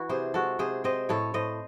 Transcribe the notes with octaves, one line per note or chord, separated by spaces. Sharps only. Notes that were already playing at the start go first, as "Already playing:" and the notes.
Already playing: E3 E4 F#4
C3 G#4 C5
G#3 F#4 A4
C3 G#4 C5
C4 C5 D#5
A2 A4 C#5
A2 C5 D#5